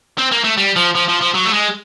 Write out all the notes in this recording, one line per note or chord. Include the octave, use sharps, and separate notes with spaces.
C4
A#3
A3
G3
F3
F3
F3
F3
F#3
A3
G#3